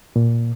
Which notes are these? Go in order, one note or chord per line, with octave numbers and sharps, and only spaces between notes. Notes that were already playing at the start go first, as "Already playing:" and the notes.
A#2